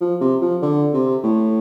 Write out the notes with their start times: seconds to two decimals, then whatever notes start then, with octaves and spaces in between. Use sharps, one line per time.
0.01 F3
0.21 C3
0.42 F3
0.62 D3
0.93 C3
1.24 A2